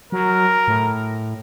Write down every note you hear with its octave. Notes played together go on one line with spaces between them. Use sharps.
F#3 A#4
A2